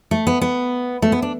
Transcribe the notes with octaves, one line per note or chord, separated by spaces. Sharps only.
A3
B3
B3
A3
B3
D4